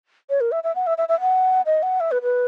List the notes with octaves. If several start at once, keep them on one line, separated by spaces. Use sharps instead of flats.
C#5
A#4
E5
E5
F#5
E5
E5
E5
F#5
D#5
F#5
E5
B4
B4